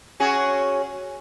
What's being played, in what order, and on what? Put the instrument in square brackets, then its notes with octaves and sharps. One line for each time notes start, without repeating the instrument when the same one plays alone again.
[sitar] C#4 F#4 G#4